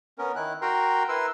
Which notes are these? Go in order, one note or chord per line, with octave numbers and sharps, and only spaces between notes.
B3 C#4 A#4
D#3 E4 F#6
F#4 A#4 G5 A#5 C6
E4 A#4 B4 C6 E6